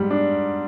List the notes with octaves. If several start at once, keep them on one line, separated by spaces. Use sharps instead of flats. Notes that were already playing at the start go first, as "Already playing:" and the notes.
Already playing: G#2 G3
D4